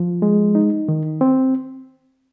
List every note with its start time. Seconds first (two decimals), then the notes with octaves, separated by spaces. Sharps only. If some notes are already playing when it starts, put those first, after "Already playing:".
Already playing: F3
0.22 G#3
0.55 D#4
0.88 D#3
1.21 C4